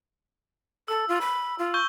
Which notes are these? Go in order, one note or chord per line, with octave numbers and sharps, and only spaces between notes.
A4 E6
F4
B5
F4
C#6 G6 G7